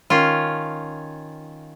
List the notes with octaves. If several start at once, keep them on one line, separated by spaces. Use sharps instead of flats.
D#3 C#4 F4